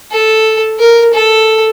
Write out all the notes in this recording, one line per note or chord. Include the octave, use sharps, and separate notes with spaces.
A4
A#4
A4